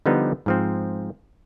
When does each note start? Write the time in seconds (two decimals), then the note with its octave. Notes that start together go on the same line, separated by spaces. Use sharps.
0.06 D3 F3 G3 B3 D#4
0.46 G#2 F3 C4